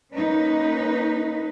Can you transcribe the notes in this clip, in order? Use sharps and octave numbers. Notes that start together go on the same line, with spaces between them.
A#3 C#4 D#4 B4